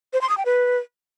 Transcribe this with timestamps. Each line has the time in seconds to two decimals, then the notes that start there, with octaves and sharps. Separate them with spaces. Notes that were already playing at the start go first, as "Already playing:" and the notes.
0.13 C5
0.21 C6
0.29 D#6
0.38 G5
0.46 B4